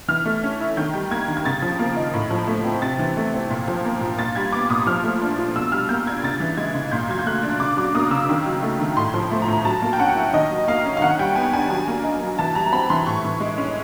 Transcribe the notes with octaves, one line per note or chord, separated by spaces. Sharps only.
E3 F6
A3
C#4
E4
D#3 G6
G3
A#3 G#6
D#3
G#6
C#3 A6
F3
A#3
D#4
A2
F3
A3
C4
C3 A6
E3
A3
C4
A#2
F3
A#3
A#2
A#2 A6
G3 G#6
B3 D6
A#2 D#6
F3 F6
A3
D4
F4
B2 E6
G3 F6
A#3 G6
D4 G#6
C#3 A6
E3
G#3 G#6
C#3
A#2 G6
F#3 G#6
G6
A3 F#6
D4
C#3 D6
F#3 D6
A#3 D#6
C#3 E6
D#3
F#3
A3
D#3
A2 C6
F3
A3
A#5
A2
F#3 A5
A#3
G5
C#4 F#5
E4
D#3 D#5
F#3
A#3 F5
C#4
F5
D#3 F#5
G3 G5
B3 G#5
D4 G#5
F#3 G#5
A#3
D#4
F#3
E3 A5
G3 A#5
C4 B5
E3 C6
A2 C#6
E3
G#3
C#4